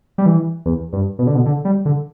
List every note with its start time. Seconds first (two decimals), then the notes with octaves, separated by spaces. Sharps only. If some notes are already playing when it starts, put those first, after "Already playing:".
0.18 G3
0.26 E3
0.65 E2
0.93 G2
1.19 B2
1.27 D3
1.35 B2
1.46 D3
1.65 G3
1.85 D3